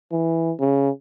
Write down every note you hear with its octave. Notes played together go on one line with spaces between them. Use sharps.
E3
C#3